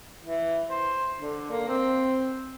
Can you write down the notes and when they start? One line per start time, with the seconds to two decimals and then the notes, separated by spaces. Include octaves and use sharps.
0.23 E3
0.70 C5
1.19 D3
1.50 A#3
1.68 C4